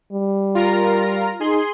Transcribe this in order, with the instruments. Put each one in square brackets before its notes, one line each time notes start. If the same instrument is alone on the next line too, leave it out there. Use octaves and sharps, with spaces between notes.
[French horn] G3
[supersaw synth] F4 A#4 A#5
[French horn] D#4 [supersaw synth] G#4 C6